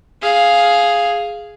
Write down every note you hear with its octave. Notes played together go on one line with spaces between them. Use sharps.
G#4 F5